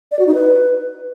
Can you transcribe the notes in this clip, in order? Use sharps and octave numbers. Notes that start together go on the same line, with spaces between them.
D5
F#4
D#4
B4